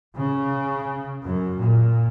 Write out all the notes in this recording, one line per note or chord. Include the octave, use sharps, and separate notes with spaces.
C#3
F#2
A#2